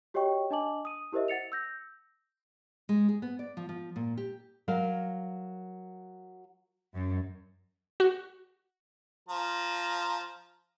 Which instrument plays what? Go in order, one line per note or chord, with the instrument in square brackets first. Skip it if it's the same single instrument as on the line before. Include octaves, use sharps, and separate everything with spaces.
[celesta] F#4 G4 C#5 D#5 G5 C#6
D4 D#5 G#5 A5 D6 F#7
D#6 D#7
E4 G4 A#4 C5 D#5 E5
F#5 A6 C#7 F7
E6 G6 A#6
[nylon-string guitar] G#3
G#4
B3
D5
F3
F3
A#2
G4
F#3 A#4 F5
[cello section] F#2
[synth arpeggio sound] F#4
[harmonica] F3 A#5